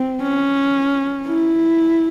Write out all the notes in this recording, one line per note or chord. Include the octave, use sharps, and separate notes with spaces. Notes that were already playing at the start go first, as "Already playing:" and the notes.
Already playing: C4
C#4
E4